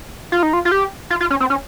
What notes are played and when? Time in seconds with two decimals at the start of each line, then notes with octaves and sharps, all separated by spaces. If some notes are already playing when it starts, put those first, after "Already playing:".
0.32 F4
0.43 D#4
0.53 F4
0.65 F4
0.72 G4
1.10 F4
1.21 F4
1.30 C#4
1.40 C4
1.50 C#4